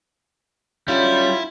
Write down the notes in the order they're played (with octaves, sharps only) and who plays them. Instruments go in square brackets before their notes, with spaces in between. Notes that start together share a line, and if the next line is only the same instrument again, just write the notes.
[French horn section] D3 F#3 C#4 [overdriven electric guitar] G3 [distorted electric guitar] E4 [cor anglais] F4